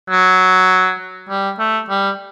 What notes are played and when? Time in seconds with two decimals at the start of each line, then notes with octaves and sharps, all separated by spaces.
0.10 F#3
1.29 G3
1.59 A3
1.89 G3